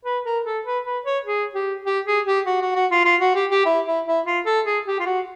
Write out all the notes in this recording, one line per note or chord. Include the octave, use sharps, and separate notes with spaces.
B4
A#4
A4
B4
B4
C#5
G#4
G4
G4
G#4
G4
F#4
F#4
F#4
F4
F4
F#4
G4
G4
E4
E4
E4
F4
A4
G#4
G4
F4
F#4